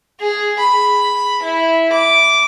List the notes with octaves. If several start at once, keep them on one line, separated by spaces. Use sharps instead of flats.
G#4
B5
E4
D6